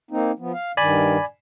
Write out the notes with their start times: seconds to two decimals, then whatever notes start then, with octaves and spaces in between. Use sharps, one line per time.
0.11 A#3 C4 D#4
0.39 F3 B3
0.53 F5
0.77 G2 D#3 D5 G#5 B5